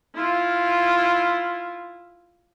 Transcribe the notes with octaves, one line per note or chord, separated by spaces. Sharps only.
E4 F4